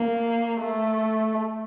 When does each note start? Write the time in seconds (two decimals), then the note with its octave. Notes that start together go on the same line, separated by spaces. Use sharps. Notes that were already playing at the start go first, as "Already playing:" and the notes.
Already playing: A#3
0.62 A3